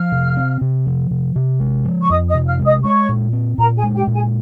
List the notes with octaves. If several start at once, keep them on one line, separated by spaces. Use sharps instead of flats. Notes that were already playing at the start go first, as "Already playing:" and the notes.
Already playing: F3 F5 F6
C3
C4
C3
F3
C3
C3
G#3
F3
C#6
F2 D#5 D#6
D#5 D#6
C3
F5 F6
G#3
D#5 D#6
G#3 C#5 C#6
A#2
C4
A#2 A#4 A#5
G#4 G#5
G#3
G4 G5
A#2
G#4 G#5